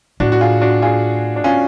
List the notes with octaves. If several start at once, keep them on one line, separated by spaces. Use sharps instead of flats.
A2 D4 F#4
F#4
F4 G#4
D4 F#4
F4 G#4
D4
C#4 F4